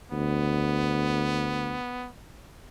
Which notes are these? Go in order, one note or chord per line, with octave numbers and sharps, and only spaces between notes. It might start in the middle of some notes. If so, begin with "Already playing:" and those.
D2 B3